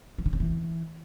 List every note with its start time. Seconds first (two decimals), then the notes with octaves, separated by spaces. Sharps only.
0.18 F3
0.26 D3
0.33 C#3
0.40 E3